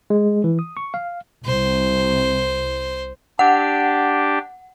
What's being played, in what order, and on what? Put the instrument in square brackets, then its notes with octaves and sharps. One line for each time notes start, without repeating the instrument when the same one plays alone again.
[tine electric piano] G#3
E3
D#6
C#6
F5
[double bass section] C2 [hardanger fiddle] C5
[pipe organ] D4 G4 [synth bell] F#5